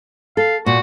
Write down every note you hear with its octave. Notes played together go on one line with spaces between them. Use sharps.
A4 F5
A#2 F#4